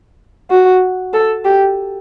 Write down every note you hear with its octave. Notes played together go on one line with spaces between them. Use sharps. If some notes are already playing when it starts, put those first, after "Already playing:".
F#4
A4
G4